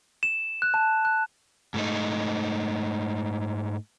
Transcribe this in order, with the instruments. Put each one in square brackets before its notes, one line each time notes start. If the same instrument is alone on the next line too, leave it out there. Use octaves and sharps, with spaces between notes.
[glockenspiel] E7
F#6
A5
F#6
[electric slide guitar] G#2 A3 D#4